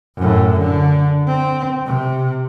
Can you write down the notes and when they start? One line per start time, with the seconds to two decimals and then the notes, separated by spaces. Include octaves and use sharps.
0.16 F#2 A2
0.59 D3
1.27 C4
1.86 C3